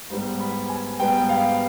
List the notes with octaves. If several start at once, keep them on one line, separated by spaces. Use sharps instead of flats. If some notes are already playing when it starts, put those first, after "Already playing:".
G#2 G3 B3 C5
B5
G#5
G#2 G3 B3 G5
F5